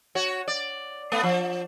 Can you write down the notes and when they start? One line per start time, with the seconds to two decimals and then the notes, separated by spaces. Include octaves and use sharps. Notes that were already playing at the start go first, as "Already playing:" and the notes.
0.15 F#4 C#5
0.48 D5
1.12 A3 B3
1.23 F3